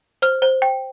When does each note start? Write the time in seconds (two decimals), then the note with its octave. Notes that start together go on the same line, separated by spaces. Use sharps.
0.22 C5 F6
0.42 C5
0.62 G5